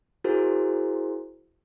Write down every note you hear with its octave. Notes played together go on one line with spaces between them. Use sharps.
E4 F#4 G#4 A#4 C5